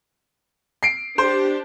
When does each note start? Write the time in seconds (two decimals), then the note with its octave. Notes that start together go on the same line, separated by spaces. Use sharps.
0.83 C7 D7
1.18 D4 G4 C5